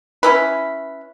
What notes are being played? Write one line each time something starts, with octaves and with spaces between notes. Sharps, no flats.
C#4 E4 B4